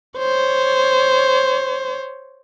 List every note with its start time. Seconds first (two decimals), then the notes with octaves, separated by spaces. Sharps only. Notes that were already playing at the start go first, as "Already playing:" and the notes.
0.18 C5 C#5